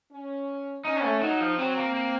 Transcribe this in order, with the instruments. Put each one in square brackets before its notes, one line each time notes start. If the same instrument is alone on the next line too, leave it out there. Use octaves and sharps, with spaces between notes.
[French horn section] C#4
[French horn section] C#4 [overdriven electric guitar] D#4
[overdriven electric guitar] A3
[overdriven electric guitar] F#3 [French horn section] D#4
[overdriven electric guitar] F3
[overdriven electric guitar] F#3 [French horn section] C4
[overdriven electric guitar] A#3
A#3